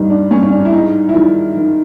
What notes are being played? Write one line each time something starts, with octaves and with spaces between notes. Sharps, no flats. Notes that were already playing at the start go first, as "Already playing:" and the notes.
Already playing: G2 G3 D#4
D4
G2 C#4
C#4
D4
E4
G#2 D#4
E4
D#3 F4
D#3